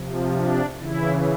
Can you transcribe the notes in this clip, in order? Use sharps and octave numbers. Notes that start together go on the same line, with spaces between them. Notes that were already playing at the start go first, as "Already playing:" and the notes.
Already playing: C3 F3
D4
C#3 E3 E4